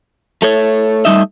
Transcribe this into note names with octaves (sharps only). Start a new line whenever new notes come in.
A3 A4 C#5
G3 A3 D#4 D#5 E5